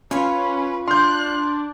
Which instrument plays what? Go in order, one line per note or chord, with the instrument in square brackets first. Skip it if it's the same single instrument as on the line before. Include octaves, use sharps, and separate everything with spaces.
[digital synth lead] C#4 [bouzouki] F4 C#5 [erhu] B4
[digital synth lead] D4 [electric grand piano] C6 G6 [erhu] F#6